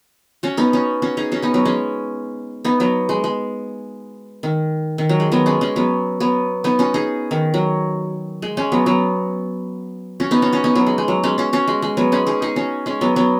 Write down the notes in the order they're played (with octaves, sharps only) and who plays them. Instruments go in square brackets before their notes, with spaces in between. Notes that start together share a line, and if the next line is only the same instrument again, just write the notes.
[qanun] C#4 F#4
B3 D#4
C#4 F#4
C#4 F#4
D#4 G#4
C#4 F#4
B3 D#4
F#3 B3
G#3 C#4
B3 D#4
F#3 B3
G#3
G#3
D#3
D#3
F#3
G#3
F#3 B3
G#3 C#4
G#3 C#4
F#3 B3
F#3 B3
B3 D#4
C#4 F#4
D#4 G#4
D#3
F#3
G#3
G#3 C#4
F#3 B3
F#3 B3
C#4 F#4
B3 D#4
C#4 F#4
C#4 F#4
B3 D#4
F#3 B3
G#3
G#3
F#3
G#3 C#4
C#4 F#4
C#4 F#4
G#3
G#3
F#3 B3
G#3 C#4
D#4 G#4
D#4 G#4
C#4 F#4
G#3 C#4
F#3 B3
F#3 B3